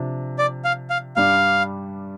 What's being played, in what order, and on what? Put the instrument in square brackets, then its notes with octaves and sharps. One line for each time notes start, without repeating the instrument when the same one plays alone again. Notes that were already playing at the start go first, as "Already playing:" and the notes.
Already playing: [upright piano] C3 F3 D4
[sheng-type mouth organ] D5
F5
F5
[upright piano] G2 G3 D4 [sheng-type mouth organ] F5